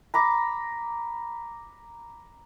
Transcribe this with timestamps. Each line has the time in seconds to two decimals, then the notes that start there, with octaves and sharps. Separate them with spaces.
0.14 A#5 B5 D6